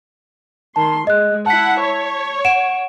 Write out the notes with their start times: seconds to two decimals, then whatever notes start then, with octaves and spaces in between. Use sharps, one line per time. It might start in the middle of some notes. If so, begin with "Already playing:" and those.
0.76 D#3 A5 C6
1.07 G#3 D#5 F#6
1.46 E4 F#5 A5 B6
1.80 C#5
2.45 F#5 D7 E7